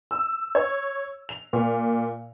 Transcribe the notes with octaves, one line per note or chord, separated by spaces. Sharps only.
E6
C#5
F7
A#2